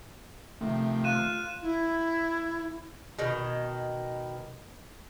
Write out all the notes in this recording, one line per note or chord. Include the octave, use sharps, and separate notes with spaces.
C3 D#3 F3 A3
F4 F#6 D#7 E7
E4
B2 D#3